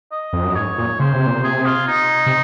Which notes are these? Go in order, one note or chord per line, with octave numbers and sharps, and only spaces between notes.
D#5
F2
F#2
D#5
G#2 C#5
A#2
C#3 C5
C3
A#2
C3 G#4
F4
D#4
C3